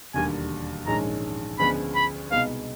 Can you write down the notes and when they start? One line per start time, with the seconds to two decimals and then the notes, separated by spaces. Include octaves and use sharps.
0.14 E1 D#2 D3 G3 G#5
0.87 A#1 G#2 D#3 G#3 C#4 A#5
1.59 D2 C#3 F3 G#3 B3 B5
1.95 B5
2.31 C2 B2 G#3 B3 D#4 F5